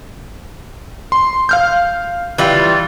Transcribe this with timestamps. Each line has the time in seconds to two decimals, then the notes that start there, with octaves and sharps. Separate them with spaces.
1.12 C6
1.49 F5 F6 G6
2.38 E3 G3 F4